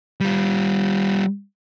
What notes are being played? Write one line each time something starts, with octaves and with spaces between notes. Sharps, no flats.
G3 F4